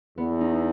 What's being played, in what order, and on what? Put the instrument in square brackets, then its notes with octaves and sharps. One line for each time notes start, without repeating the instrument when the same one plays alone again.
[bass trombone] E2 [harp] B3
[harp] D#4